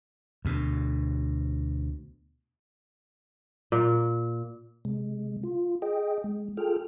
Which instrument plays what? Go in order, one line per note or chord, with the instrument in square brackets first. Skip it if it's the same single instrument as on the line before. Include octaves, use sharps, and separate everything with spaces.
[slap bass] D2 B2
[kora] A#2
[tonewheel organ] C3 G#3
F4
G#4 D#5 G5
G#3
F4 G#4 A4 G5 F6